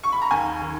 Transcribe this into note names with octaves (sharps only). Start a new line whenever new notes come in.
C#6
B5
A#5
D#2 G#5
D#3